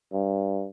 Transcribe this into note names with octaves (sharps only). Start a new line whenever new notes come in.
G2